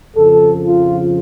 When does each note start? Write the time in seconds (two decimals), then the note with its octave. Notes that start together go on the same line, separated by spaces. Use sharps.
0.16 F2 C#3 F3 A4
0.64 F4